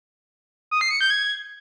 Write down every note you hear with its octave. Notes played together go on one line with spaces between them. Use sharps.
D#6
C7
C#7
G6
G#6